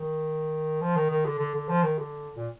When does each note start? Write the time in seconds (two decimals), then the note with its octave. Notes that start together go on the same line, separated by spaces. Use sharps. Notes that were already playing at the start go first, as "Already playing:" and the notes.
Already playing: D#3
0.81 F3
0.96 D#3
1.10 D#3
1.25 D3
1.39 D3
1.54 D3
1.69 F3
1.83 D#3
1.99 D3
2.37 A#2